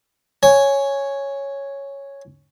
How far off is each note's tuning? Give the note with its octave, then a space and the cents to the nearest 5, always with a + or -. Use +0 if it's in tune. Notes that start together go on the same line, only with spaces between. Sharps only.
C#5 +0 G#5 +0